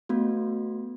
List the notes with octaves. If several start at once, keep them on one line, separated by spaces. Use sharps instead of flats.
A3 B3 F#4